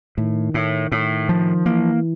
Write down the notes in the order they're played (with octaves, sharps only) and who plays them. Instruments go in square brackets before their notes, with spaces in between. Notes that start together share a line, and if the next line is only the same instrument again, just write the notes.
[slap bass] A2 [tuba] D#3
[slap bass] A2
[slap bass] A2 [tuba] D#3
[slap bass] F3
[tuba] E3 [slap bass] A#3